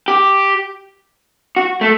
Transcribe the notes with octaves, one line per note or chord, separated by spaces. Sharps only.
G4
F#4
A3